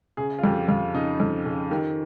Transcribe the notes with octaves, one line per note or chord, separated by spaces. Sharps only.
C#3 G#4
F4
F2 G4
F2 F4
C#3 D#4
F2
C#3
D#3 G4